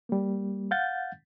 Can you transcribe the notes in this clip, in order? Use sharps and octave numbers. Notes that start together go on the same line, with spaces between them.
G3 A#3
F5 F#5 G6 A6